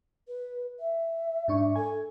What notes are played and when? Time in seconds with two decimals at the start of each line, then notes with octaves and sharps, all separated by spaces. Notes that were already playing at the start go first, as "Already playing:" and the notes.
0.28 B4
0.80 E5
1.48 G#2 D4 C#6
1.76 A4 G#5